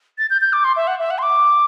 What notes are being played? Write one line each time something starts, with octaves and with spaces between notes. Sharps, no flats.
A6
G6
G6
D6
C6
E5
F#5
E5
F#5
C6
D6